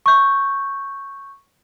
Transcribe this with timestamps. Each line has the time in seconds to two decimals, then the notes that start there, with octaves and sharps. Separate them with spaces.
0.06 C#6 G6